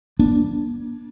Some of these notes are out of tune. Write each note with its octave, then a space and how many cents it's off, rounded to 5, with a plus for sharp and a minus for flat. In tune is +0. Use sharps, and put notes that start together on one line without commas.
A#3 +40 D4 -5